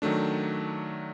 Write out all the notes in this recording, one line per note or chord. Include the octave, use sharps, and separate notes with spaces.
D#3 F#3 A3 D4